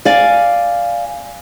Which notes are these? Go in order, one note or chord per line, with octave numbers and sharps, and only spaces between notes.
D5 F5 G#5